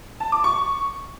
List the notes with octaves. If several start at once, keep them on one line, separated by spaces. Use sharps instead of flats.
A5
D6
C#6